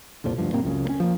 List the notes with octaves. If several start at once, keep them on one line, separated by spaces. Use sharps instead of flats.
C2 F2 A#2 F3
D2 G2 F3
G2 A#2 A#3 C4
C#2 F#2 C#3
A#3 C#4
F3 A#3